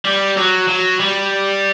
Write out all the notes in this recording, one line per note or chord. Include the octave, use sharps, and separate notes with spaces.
G3
F#3
F#3
G3